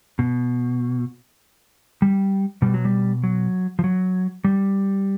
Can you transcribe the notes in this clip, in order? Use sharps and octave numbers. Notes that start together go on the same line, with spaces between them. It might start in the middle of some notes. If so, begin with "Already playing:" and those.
B2
G3
B2 G3
F#3
G3
F#3
F3
F#3
G3